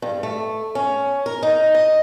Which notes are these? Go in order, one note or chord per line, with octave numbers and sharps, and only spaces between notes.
G2
A3
C#4
A#4
D#4
D#5